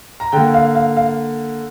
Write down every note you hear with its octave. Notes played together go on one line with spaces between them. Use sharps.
A#5
D3 A#3 G5
F5
F5
F5